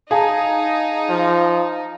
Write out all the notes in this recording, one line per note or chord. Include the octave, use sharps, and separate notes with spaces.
D#4 G#4 F5 A5
F3